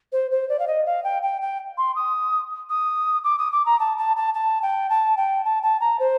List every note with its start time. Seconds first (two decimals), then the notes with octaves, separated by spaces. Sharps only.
0.12 C5
0.31 C5
0.49 D5
0.59 F5
0.67 D#5
0.86 F5
1.04 G5
1.22 G5
1.41 G5
1.78 C6
1.96 D#6
2.69 D#6
3.24 D6
3.38 D#6
3.52 D6
3.66 A#5
3.80 A5
3.98 A5
4.17 A5
4.34 A5
4.62 G5
4.90 A5
5.17 G5
5.45 A5
5.63 A5
5.81 A#5
5.99 C5